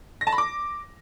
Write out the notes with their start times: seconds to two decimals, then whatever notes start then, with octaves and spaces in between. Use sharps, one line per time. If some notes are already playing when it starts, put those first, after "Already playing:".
0.21 A#6
0.27 A5
0.32 B5
0.38 D6